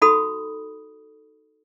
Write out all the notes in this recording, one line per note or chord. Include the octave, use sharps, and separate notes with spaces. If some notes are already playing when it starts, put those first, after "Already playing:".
D#4 F#4 A4 B5 D#6